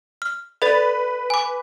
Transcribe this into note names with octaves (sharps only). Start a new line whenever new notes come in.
F6
A4 B4 D5 A6
G#5 D6